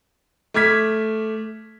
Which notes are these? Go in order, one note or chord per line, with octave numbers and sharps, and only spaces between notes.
A3 D6 F6 G#6 B6